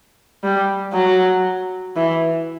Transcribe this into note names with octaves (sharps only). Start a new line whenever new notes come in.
G3
F#3
E3